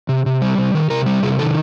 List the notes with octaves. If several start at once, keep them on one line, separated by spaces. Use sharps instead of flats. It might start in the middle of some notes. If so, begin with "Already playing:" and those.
C3
C3
G3
C3
D#3
C3 A#4
G3
C3 G#4
D#3 A4